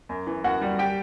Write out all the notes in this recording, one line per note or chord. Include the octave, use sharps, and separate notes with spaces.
F#2
E3
F#2 F#4 F#5
G3
G4 G5